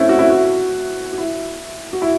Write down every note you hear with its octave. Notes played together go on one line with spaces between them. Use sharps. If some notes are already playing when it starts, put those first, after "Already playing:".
Already playing: A3 C4 C#4 E4
F#4
E4
F#4
F#4
E4
F#4
E4